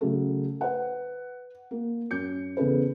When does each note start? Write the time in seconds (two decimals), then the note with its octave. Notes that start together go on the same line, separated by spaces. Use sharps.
0.01 C#3 F#3 A3
0.61 B4 F#5
1.71 A#3
2.11 F#2 G6 C#7
2.57 E2 C#3 A4 B4